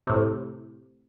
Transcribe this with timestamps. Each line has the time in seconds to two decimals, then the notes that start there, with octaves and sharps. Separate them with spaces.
0.07 A2 C3